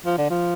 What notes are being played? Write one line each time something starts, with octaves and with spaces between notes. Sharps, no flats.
F3
D3
F3